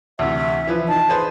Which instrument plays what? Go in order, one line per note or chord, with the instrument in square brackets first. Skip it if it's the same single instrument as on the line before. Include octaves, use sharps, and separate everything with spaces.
[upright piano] D2 C3 E3 [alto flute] E5
[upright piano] E3 F3 B4
[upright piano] D#4 [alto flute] A5
[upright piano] G#4 B4 C5